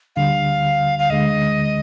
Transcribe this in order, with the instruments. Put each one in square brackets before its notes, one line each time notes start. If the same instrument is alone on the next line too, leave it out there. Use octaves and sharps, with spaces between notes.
[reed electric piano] D2 D3 G3 [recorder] F5
[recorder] F5
[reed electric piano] D2 D3 G#3 [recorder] D#5